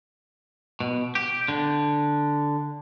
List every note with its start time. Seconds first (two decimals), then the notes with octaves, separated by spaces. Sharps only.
0.80 B2
1.15 G4
1.48 D3